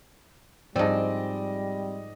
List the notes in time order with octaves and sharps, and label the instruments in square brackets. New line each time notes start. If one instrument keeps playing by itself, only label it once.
[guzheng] G#2 F3 [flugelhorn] G3 [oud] C4 [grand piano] D5 D#5